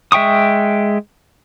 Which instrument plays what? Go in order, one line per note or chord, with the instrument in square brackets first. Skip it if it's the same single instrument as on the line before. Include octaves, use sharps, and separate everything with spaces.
[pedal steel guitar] G#3 E5 G5 C#6 D#6